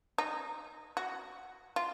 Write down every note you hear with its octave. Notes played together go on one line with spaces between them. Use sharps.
D#4
F#4
F4